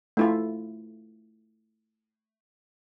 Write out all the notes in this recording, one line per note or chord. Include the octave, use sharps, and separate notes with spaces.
A3 E4 F4